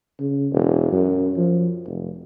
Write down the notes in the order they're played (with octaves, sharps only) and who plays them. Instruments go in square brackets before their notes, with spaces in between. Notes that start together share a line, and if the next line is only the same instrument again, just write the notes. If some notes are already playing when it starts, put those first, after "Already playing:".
[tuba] C#3
E1
F#2
F3
F1